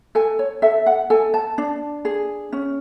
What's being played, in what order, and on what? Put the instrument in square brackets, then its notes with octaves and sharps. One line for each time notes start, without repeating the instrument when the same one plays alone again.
[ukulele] A4 G#5
C#5
A4 E5
F#5
A4 G#5
A5
D4
G#4
C#4